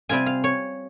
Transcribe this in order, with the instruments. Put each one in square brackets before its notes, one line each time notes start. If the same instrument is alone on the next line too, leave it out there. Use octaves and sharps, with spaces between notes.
[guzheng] C3 G3 C4 F4 G#5
F5
C#5